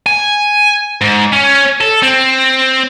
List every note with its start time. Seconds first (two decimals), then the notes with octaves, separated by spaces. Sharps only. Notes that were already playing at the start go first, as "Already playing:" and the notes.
0.06 G#5
1.01 G#2
1.33 C#4
1.81 A4
2.03 C4